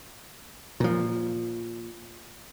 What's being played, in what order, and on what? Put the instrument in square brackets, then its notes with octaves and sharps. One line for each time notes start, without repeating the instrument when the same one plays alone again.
[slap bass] A#2 F3